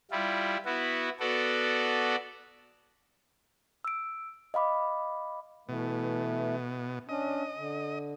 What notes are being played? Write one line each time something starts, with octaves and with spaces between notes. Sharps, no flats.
G3 E4 F4
B3 E4 F#4
B3 F#4 A4 D5
E6 D7
D#5 F5 B5 D6
B2 E3 A3
C#4 D4 D#5
D3